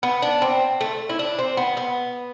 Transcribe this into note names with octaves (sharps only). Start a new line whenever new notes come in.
B3
D4
C4
A3
E4
D4
C4
B3
B3